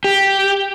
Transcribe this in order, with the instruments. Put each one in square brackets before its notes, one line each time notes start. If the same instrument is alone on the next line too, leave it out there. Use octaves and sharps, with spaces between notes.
[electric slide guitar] G4